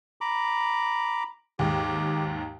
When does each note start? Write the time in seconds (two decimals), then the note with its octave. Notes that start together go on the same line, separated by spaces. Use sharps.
0.21 A#5 B5 D6
1.59 D#2 G#2 G4